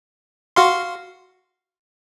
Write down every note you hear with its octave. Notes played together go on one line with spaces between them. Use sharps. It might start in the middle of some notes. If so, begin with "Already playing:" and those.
F#4 F5 C6